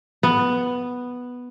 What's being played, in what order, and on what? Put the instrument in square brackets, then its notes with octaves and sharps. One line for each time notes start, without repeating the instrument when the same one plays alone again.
[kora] B3